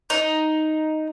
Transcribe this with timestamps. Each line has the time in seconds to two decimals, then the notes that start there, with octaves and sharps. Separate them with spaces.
0.10 D#4